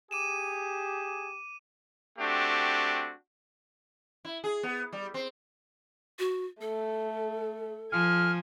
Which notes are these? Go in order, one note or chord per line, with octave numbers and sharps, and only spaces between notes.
G4 G#4 D6 D#7 E7
A3 C4 D4 F#4 G4
E4
G#4
B3
G3
C4
F#4
A3 A4
F3 G#5 F6